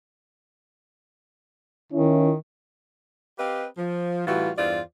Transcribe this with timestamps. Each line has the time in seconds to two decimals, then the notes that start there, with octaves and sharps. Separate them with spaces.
1.92 D#3 C#4 E4
3.38 C4 G4 B4 D#5 F5
3.78 F3
4.27 A2 E3 G3 F4 F#4
4.57 E2 G2 F4 C5 D5